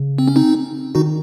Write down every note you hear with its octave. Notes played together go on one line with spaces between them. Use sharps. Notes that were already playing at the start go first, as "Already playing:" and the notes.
Already playing: C#3
C4
C#4
C4 D#4
D#3 D#4 F#4